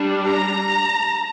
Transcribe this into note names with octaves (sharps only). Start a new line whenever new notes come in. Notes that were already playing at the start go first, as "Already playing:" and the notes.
Already playing: G3 D4
A#5